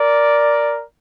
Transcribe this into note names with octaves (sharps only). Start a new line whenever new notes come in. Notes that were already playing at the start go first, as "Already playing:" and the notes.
Already playing: A#4 D5